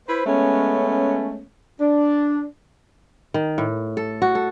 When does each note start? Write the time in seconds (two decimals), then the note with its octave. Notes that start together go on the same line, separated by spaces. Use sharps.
0.07 E4 B4 C5
0.26 G#3 A3 B3 C#4
1.79 D4
3.34 D#3
3.58 A2
3.97 A4
4.22 F#4
4.35 A4